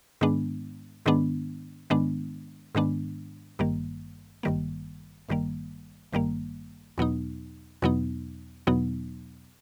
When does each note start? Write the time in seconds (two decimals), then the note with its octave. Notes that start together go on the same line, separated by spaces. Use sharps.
0.21 G#2 D#3 G#3 B3 D4
1.06 G#2 D#3 G#3 B3 D4
1.90 G#2 D#3 G#3 B3 D4
2.75 G#2 D#3 G#3 B3 D4
3.59 G#1 G2 D#3 G3 A#3
4.43 G#1 G2 D#3 G3 A#3
5.29 G#1 G2 D#3 G3 A#3
6.13 G#1 G2 D#3 G3 A#3
6.98 E2 B2 F#3 B3 D#4
7.82 E2 B2 F#3 B3 D#4
8.67 E2 B2 F#3 B3 D#4